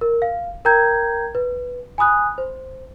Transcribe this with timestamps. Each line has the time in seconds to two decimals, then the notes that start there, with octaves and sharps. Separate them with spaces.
0.01 A#4
0.22 F5
0.65 A#4 G5 A#5 G6 G#6
1.35 B4
1.98 G#5 B5 D#6 F#6
2.38 C5